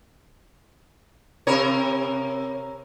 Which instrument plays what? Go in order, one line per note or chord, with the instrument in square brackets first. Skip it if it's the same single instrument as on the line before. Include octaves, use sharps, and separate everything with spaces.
[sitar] C3 A#4 C#5